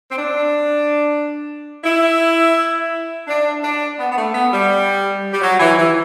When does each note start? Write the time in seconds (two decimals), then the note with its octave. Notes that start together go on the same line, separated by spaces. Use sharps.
0.10 C4
0.18 D4
1.84 E4
3.27 D4
3.63 D4
3.99 B3
4.12 B3
4.17 A3
4.34 B3
4.52 G3
5.32 G3
5.42 F#3
5.60 E3
5.77 E3